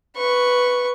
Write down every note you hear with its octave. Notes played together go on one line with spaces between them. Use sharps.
B4 C#6